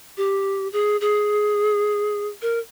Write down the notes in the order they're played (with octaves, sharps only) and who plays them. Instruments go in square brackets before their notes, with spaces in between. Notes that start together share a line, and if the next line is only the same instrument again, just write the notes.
[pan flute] G4
G#4
G#4
A#4